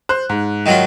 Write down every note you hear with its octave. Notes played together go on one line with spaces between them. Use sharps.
C5 F#6
G#2
D#3 F#3 F4